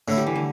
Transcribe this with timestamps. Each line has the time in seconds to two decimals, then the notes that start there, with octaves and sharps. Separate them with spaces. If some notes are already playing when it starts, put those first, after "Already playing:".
0.08 A2 D3 A3 E4
0.17 G3
0.26 E3
0.36 D3